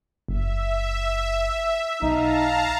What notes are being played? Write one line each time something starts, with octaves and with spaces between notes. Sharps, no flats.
F#1 E5
B1 D#4 F5 A5 A#5